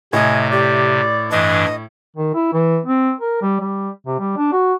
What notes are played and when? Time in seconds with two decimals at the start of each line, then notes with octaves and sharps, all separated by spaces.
0.13 A2 C3 D#5 G#5
0.51 G4 D5
1.31 G2 E3 D4 D#5
2.16 D#3
2.35 E4
2.53 E3
2.86 C4
3.21 A#4
3.42 G3
3.61 G3
4.07 C3
4.20 G3
4.37 D4
4.52 F#4